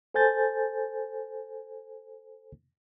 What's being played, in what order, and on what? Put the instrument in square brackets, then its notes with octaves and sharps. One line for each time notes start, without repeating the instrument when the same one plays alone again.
[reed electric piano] A4 C5 G#5 G6 A6